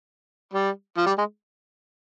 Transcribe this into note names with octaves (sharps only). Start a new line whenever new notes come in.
G3
F3
G3
G#3